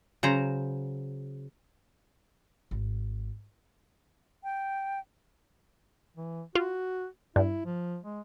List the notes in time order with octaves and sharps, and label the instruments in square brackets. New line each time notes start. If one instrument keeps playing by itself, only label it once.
[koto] C#3 F#3 C5 A#5
[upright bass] G#1
[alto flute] G5
[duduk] E3
[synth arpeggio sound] F4 [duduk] F#4
[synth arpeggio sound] G2 [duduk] E4
[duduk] F3
G#3